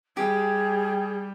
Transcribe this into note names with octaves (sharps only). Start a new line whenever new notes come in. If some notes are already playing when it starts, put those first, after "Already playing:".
G3 G4 G#4